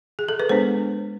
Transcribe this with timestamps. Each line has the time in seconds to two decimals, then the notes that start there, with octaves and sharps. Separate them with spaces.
0.19 G#4
0.28 A4
0.40 B4
0.49 G#3 B3 D4 C5